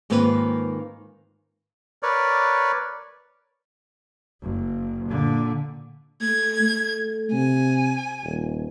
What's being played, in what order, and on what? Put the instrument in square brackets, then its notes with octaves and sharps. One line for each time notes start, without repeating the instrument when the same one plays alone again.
[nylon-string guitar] G#2 D#3 A#3 C4 F4 B4
[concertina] A#4 B4 C#5 D5
[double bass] F#1
A#2 D3
[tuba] A3 [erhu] G#6
[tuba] A3
[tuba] C3 [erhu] G#5
[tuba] D#1